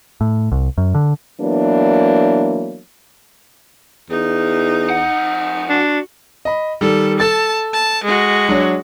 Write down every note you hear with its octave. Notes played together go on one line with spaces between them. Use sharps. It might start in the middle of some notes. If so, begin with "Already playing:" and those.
A2
C2
F#2
D3
E3 F#3 A#3 B3 D4
E2 D#4
F2 F#5
D4 F#4
D#5 B5
D#3 G3 A4
A4 A5 A6
A5
G#3 F#4
F#3 D4 C#5